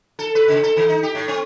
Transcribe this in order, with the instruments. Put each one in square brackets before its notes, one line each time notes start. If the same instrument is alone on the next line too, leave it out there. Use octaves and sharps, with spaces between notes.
[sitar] A4
B4
C#3
A4
D#3
D#4
G4
A2
C4